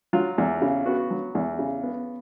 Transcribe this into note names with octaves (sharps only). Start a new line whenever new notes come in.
F#3 F4
E2
C#3
B3 F#4
F#3
E2
C#3
B3